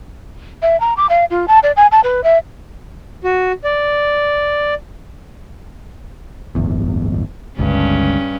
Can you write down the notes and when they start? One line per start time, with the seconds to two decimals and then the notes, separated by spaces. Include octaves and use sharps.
0.62 E5
0.80 A#5
0.97 D6
1.10 F5
1.30 F4
1.48 A5
1.63 D5
1.77 G#5
1.92 A5
2.04 B4
2.24 E5
3.24 F#4
3.64 D5
6.55 D1 G1 E2
7.59 G1 C#2 G2 C#4